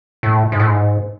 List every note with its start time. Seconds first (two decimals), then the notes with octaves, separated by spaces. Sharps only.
0.23 A2
0.52 G#2
0.60 A2
0.67 G#2